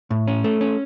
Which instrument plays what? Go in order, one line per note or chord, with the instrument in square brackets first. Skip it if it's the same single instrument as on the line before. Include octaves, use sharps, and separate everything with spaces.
[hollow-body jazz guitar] A2
C#4
A3
C#4